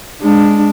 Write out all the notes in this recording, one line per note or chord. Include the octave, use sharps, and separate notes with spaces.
G#3 D4